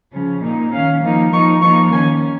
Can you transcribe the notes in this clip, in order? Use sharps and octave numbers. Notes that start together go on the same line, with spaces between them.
C#3 F3 C#4
A#2 A#3 D#4
D#3 C#4 F5
F3 A#3 D#4
F3 A#3 D#4 C#6
F3 A#3 D#4 C#6
D#3 C#4 G#5